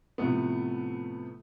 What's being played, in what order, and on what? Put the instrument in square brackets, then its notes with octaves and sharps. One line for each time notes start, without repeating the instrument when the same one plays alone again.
[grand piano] A2 C3 F3 A3 B3